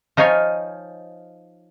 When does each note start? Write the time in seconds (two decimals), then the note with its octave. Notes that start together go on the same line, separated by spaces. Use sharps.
0.17 F3 D#4 F4 C#5 G#5